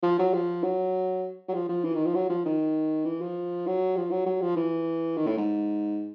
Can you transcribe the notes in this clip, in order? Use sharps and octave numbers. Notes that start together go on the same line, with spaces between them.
F3
F#3
F3
F#3
F#3
F3
F3
E3
D#3
F3
F#3
F3
D#3
E3
F3
F#3
F3
F#3
F#3
F3
E3
D#3
A2
G#2